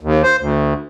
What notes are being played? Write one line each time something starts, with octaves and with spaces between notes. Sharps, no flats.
D#2
C5
D2